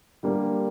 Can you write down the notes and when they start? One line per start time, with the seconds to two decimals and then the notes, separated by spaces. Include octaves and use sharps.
0.23 D3 G3 A#3